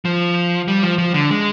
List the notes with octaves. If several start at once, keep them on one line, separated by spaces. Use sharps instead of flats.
F3
G3
F3
F3
D3
G#3